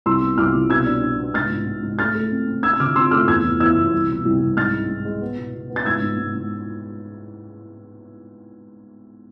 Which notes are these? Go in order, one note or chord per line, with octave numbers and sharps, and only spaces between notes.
C2 C6 E6
B3
C2 D6 F6
C2
B2 E6 G#6
D4
D4
B3
G#2 F6 A6
G#2
G#2
G#2
A3 F6 A6
A3
C4
C4
C4 E6 G#6
E6
D3 D6 F6
C4 C6 E6
A3 D6 F6
E2 E6 G#6
E2
E2 E6 G#6
E2
C2
B2
C2
C2
G#2 F6 A6
G#3
G#2
G#3
B3
B2
B2
B3
A6
G#2 E6 G#6
G#2
G#2
G#2